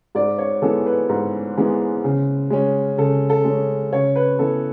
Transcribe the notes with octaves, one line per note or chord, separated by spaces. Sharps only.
G#2 D5
C#5
E3 G#3 B3 A4
B4
G#2
E3 G#3 B3
C#3
G#3 C#4
C#3 A4
A4
G#3
C#4
C#3 C#5
B4
E3 B3 A4